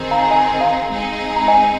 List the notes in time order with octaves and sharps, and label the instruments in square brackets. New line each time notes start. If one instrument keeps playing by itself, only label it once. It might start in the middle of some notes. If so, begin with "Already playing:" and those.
Already playing: [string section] D#3 C4 D#4 G#4
[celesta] F5 A#5
A#5
D#5 G#5
F5 A#5
[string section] G#3 C4 D#4 G#4
[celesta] A#5
D#5 G#5